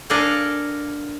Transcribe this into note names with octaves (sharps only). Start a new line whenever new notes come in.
D4 A4 A#4 D5 F5 G#5